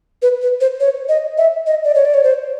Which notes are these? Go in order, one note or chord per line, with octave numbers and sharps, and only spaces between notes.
B4
B4
C5
C#5
D#5
E5
D#5
D5
C#5
D5
C#5
C5